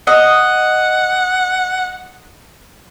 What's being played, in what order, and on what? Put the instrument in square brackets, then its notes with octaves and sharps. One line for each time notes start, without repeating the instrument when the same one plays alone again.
[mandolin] D#5 [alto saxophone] F#5